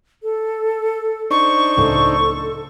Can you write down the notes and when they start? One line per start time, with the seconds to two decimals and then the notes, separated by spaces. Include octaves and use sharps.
0.23 A4
1.31 D4 D#4 C5 C#6
1.77 C#2 A2 C#3 A4